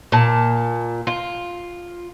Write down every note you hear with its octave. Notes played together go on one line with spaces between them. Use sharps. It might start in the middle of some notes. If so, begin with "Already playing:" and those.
A#2 A5
F4